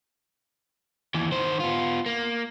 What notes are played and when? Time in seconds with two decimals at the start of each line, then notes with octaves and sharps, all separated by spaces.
1.14 D#2 E3
1.32 D#3 C5
1.60 B3 F4
2.06 A#3